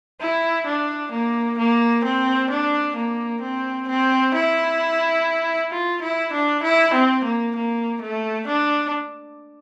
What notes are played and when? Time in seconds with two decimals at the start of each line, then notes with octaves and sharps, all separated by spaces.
0.21 E4
0.66 D4
1.12 A#3
1.58 A#3
2.04 C4
2.50 D4
2.96 A#3
3.41 C4
3.88 C4
4.34 E4
5.71 F4
6.02 E4
6.33 D4
6.63 E4
6.93 C4
7.24 A#3
7.55 A#3
8.01 A3
8.47 D4